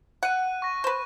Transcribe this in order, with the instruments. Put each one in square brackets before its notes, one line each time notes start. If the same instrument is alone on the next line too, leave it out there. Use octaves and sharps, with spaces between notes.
[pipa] F#5 [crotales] F#6 D#7
[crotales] C#6 A#6
[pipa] B4 C5